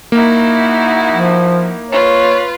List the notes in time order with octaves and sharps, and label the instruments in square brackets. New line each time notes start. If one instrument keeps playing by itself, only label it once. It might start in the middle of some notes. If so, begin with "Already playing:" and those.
[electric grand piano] A#3 [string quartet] D#4 E4 F#4
[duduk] F3
[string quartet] F4 B4 [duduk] C#5